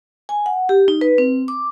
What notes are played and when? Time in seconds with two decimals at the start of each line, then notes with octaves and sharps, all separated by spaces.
0.29 G#5
0.46 F#5
0.69 G4
0.88 D#4
1.01 B4
1.18 C4
1.48 D6